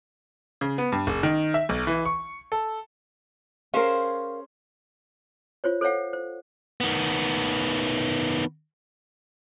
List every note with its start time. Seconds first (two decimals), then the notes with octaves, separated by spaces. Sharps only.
0.61 C#3
0.78 B3
0.92 G2
1.07 F#1
1.23 D#3
1.54 E5
1.69 B1
1.87 E3
2.05 C#6
2.52 A4
3.74 C#4 G#4 A#4 C5 F5
5.64 F4 C5 C#5
5.81 A4 C5 C#5 F5 F#5
6.13 C5
6.80 D#3 B3